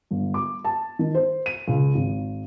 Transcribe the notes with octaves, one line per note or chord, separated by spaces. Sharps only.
G1
D6
A5
D#3
C5
D#7
C#2
G#1